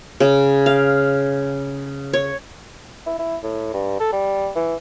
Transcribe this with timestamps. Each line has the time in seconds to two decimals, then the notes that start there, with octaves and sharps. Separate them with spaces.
0.20 C#3
0.66 F5
2.13 C#5
3.06 E4
3.18 E4
3.43 A2
3.74 G2
4.00 A4
4.13 G3
4.56 E3